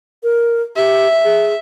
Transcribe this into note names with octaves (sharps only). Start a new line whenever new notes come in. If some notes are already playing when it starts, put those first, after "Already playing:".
A#4
G4 E5
G#4